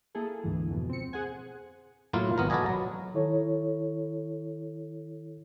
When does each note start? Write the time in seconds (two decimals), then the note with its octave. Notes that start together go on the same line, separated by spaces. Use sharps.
0.15 A#3 E4 G#4 A4
0.44 D2 G#2 E3
0.71 F2 B2
0.89 C4 C#7
1.13 G#4 C5 F#5 G#5
2.13 A2 F#3 A#3 E4 F4
2.38 G#1 B3 F#4 A#4
2.50 F#4 A4 B4 D5 D#5 G#5
2.66 F#3 A#5
3.14 D#3 E4 A4 C#5